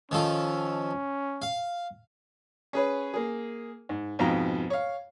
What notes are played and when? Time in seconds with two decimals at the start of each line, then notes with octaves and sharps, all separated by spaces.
0.11 D#3 F3 C#4 A4
1.42 F5
2.73 C#4 G#4 B4 C#5
3.14 A#3 G#4
3.89 G#2
4.19 F2 G#2 B2 F5 G5 A#5
4.70 C#5 F5